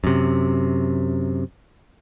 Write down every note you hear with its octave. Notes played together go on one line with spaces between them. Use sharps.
F#2 C3